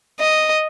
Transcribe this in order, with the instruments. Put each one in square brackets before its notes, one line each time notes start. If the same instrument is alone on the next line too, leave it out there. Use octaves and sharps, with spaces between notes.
[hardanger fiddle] D#5